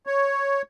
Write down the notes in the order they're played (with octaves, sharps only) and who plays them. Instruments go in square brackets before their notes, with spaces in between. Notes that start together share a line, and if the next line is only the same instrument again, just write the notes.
[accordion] C#5